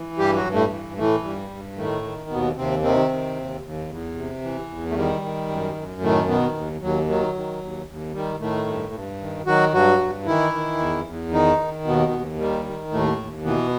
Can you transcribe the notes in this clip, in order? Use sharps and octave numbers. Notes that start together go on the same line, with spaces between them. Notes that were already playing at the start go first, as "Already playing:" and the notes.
Already playing: E3
G2 G3 G4
F#3 F#4
G2
A2 A3
E3
A2 E3 A3
G2 G3
G2
A2 D#3 A3
D#3
D#2 B2 B3
D#2 C3 C4
C3 D#3 C4
D#3
D#2
D#2
E2
C3
E3
E2
A3
D#3 G3
D#3
F#2
F#2
A2 D#3 A3
B2 D#3 B3
D#2
D#2 F#3
D#3 F#3
D#3
D#2
D#2
D#3 G3
A2 D#3 A3
G2
G2
D#3
D#3 F#3 F#4
G2 F#3 F#4
G2
D#3 E3 E4
D#3
E2
E2
D#3 D#4
D#3
D#2 B2 B3
D#2
D#3 G3
D#3
D#2 A2 A3
D#2
B2 E3 B3